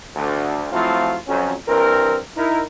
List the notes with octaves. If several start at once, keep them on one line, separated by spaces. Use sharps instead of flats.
D2
F3 F#3 A3 C4 E4 F4
F2 F#3 C#4
G2 E3 C4 A#4
D#4 E4 A#4